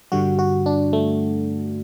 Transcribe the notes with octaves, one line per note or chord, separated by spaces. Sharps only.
G2 D3 G3 F#4
F#4
D4
A3